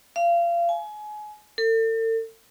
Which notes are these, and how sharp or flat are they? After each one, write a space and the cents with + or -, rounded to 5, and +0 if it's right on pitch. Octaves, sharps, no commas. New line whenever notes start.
F5 -30
G#5 +30
A4 +40